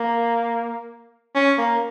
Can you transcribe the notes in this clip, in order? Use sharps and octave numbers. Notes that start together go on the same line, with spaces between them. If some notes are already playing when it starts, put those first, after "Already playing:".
Already playing: A#3
C#4
A#3